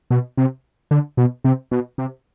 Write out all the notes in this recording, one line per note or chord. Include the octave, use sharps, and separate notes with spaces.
B2
C3
D3
B2
C3
B2
C3